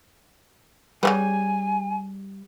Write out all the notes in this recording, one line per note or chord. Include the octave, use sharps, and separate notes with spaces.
C#3 G3 A3 B3 G#5